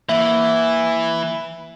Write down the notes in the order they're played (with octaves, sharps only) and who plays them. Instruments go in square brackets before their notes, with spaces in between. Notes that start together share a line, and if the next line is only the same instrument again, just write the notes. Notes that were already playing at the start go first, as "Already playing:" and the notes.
[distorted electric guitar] E3 [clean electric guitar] A#3 F#5 [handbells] E5